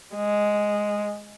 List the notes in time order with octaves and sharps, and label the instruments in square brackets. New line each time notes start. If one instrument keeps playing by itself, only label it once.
[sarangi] G#3